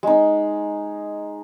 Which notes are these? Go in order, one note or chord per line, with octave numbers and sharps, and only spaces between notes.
G#3 D#4